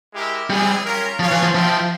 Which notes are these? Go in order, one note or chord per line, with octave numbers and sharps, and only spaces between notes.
G#3 E4 G4 A#4 E5
G3 G#3 C4 E4 G#4
C#4 F4 A#4
F3 F4 G#4 C#5 F5
E3
F3
F3 F4 C5 E5 G5